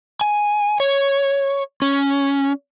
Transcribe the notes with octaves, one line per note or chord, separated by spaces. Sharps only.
G#5
C#5
C#4